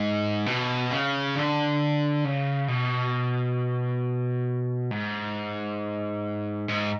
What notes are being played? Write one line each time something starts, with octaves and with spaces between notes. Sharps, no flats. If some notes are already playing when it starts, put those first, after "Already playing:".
Already playing: G#2
B2
C#3
D3
C#3
B2
G#2
G#2